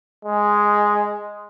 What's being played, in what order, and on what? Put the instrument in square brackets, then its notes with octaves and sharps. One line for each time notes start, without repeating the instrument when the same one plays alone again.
[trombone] G#3